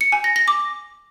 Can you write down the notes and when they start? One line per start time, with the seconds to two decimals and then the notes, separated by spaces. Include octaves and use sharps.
0.01 C#7
0.12 G#5
0.24 A#6
0.36 A#6
0.48 D6